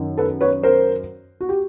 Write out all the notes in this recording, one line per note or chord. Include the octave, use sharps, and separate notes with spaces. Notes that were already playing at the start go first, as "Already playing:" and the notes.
Already playing: F#2 D#3
A4 B4
B4 C#5
A#4 C5
F#4
G4